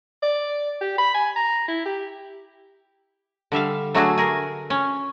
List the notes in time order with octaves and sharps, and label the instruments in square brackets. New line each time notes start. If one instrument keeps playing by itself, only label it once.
[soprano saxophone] D5
G4
B5
G#5
A#5
E4
G4
[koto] D3 G3 E5 F5
F#3 A3 D4 F#4 G#4
G#4 A#4
C#4